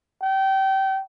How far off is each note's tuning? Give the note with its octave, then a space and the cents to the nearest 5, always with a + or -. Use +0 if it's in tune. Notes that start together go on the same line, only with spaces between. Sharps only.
G5 -25